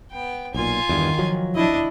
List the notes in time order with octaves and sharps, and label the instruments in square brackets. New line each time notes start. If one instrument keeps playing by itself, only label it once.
[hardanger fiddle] B3 G5
[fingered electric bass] B1 A#2 [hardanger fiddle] F4 G#5
[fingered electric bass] E2 G2 [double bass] D#3
[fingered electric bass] F3 F#3
[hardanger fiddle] D4 D#5 [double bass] E4